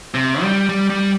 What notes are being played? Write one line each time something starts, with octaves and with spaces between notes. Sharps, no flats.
C3
G3
G3
G3